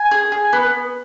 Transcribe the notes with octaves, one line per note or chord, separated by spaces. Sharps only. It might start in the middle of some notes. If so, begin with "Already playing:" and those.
Already playing: G#5
G#4
G#4
B3